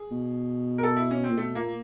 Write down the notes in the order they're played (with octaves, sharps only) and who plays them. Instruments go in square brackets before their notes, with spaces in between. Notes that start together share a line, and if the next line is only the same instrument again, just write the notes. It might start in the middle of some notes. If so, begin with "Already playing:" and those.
Already playing: [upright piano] G#4
[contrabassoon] B2
[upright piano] A#4
A4
E4
C#4
C4
[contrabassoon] A#2
[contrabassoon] B2 [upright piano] A3
[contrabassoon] A#2 [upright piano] A#3